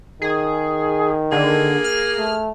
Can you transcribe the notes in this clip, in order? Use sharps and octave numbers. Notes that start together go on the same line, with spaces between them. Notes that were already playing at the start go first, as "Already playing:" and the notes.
D#3 G#4
D3 A#3 G#4
F6
A3